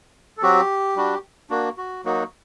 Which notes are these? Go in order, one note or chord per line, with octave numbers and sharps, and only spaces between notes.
A4
F#3 C4 F#4 G4
G3 D4 F#4
A#3 D4 F#4
F#4
F#3 A#3 D#4 F#4